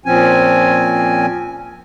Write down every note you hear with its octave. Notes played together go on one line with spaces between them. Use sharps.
A#2 F3 C4 C#4 G#5